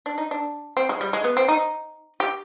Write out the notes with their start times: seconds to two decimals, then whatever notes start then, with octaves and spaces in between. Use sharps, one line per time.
0.06 D4
0.18 D#4
0.31 D4
0.77 C4
0.89 G#3
1.01 G3
1.13 G#3
1.24 B3
1.37 C4
1.48 D#4
2.20 G4